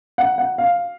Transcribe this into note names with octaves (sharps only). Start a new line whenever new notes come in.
F#5
F#5
F5